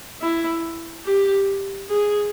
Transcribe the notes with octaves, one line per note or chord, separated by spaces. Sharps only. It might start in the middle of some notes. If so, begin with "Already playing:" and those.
E4
G4
G#4